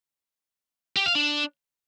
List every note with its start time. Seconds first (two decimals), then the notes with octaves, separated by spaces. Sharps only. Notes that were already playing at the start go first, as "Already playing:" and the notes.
0.96 G4
1.06 F5
1.15 D4